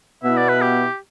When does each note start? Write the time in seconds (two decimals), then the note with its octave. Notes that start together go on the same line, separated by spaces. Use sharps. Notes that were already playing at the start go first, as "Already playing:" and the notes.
0.24 B2 B3 E4 E5
0.37 D5
0.49 B4
0.62 G4